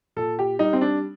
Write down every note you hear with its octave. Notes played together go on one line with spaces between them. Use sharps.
A#2 A4
G4
G3 D#4
C4
D4